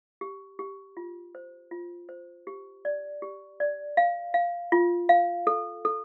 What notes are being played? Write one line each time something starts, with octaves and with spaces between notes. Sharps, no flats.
G4
G4
F4
C5
F4
C5
G4
D5
G4
D5
F5
F5
F4
F5
A4
A4